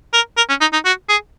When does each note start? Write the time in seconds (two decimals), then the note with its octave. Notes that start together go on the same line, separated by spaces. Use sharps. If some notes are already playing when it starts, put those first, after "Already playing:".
0.13 A#4
0.37 A#4
0.49 C#4
0.61 D#4
0.73 D#4
0.85 F#4
1.09 G#4